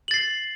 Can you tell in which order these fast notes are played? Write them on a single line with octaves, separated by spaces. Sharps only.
F#7 A6 C7